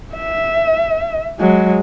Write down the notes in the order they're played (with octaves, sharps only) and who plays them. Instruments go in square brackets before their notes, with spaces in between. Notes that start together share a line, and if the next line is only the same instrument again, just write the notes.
[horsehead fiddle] E5
F#3 G#3